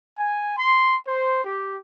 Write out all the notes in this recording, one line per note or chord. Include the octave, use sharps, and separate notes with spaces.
G#5
C6
C5
G4